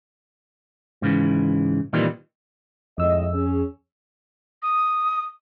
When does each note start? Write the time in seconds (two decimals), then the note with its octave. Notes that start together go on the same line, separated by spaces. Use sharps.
1.02 G#2 C#3 E3
1.93 A#2 D#3 E3 G3 C4
2.98 F2 A2 G#3 D#5 E6
3.33 C#4 G#4
4.63 D#6